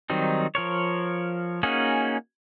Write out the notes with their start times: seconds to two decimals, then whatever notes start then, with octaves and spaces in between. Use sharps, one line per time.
0.10 D#3 F#3 G3 C4 D#4
0.55 F3 A#4 C#5
1.63 A#3 C#4 D#4 F#4 G#4